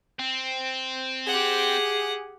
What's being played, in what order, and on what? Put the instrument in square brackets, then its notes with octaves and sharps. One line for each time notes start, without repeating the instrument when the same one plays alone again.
[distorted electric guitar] C4
[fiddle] G4 F#5 [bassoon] G#4